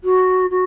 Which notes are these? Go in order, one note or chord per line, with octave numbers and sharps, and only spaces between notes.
F#4
F#4